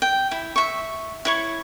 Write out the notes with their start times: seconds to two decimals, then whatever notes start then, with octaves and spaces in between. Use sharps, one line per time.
0.02 G5
0.31 E4
0.56 E5 C#6
1.25 E4 C#5 C#6